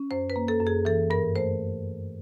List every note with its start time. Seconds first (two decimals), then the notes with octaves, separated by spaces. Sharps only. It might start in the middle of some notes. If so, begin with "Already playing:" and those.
Already playing: C#4
0.11 F#2 C5
0.30 B4
0.36 A#3
0.48 A4
0.60 F#2
0.67 G#4
0.85 E3 A4
1.10 G2 A#4
1.36 A3 C5